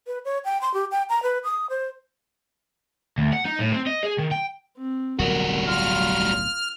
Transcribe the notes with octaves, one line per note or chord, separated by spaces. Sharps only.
B4
C#5
G5
C6
G4
G5
A#5
B4
D#6
C5
D2
F#5
D#4
A2
C4
D#5
G#4
D#3
G5
C4
D1 B1 D3 G3 F#4 A#4
F4 F6